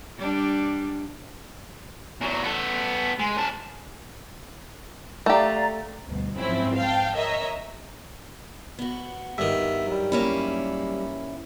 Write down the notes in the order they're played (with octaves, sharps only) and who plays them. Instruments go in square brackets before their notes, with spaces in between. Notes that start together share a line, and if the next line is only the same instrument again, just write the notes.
[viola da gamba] G3 D4
[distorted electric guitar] E2 F#3
B3 A4
G#3
C#4 A5
[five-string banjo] A3 G4 [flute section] D5 F5 A#5
[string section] D2 G2 B2
G#2 F3 F#3 C4 C#4 E4
F5 G5 A5
A#4 C#5 D#5 E5 A#5
[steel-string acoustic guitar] B3 F#4
[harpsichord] G2 D#3 [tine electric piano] E5
[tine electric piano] F#3 G3
[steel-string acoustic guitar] A#3 C#4 E4